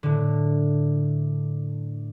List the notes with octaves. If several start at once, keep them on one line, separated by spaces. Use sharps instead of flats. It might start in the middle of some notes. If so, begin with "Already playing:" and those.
A2 D3